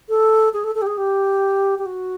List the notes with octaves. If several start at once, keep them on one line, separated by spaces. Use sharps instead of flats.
A4
G#4
A4
A4
G4
G#4
G4
G4
F#4